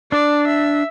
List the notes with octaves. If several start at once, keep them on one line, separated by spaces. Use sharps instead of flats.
D4 D5
E5